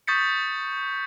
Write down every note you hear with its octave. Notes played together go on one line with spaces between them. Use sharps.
C#6 D#6 G6 A6 B6 C#7